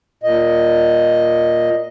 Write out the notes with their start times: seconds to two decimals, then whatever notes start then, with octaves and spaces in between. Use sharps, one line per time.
0.23 A#2 D#5